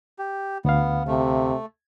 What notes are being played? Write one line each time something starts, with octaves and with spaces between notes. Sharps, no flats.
G4
D2 B3 F5
C3 A3